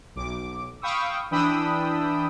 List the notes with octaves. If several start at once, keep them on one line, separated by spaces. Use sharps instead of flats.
B1 D6
F5 G5 B5 C#6 D#6 E6
E3 D4 G5 B5 D#6 E6